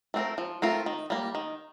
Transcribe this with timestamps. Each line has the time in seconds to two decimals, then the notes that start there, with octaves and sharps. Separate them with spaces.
0.14 A3 C4 F4 A#4
0.38 F3
0.62 A3 C4 F4 A#4
0.86 D#3
1.10 G3 A#3
1.35 D#3